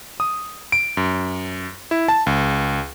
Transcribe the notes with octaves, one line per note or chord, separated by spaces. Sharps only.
D#6
D7
F#2
E4
A5
C#2